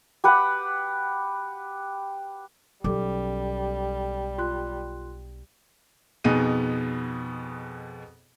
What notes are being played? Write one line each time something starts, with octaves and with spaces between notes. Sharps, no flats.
G4 B4 F#5
B1 G3 C#4 G4 A4 D6
F4 C6 F#6
F2 B2 B3 D#4 G#4 D#7